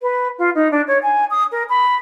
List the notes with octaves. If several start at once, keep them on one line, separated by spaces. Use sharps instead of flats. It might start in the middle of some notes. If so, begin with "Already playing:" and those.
B4
F4
D#4
D4
C#5
G#5
D#6
A#4
B5